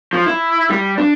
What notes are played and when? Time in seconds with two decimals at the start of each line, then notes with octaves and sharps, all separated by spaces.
0.13 F3
0.26 E4
0.70 G3
0.98 D4